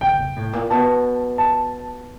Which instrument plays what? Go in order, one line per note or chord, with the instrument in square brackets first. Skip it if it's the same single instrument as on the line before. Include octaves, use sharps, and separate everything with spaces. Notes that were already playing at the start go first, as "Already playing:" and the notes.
[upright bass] D3 [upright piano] G5
[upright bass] C3
A2
A#2
[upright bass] B2 [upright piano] A5
[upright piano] A5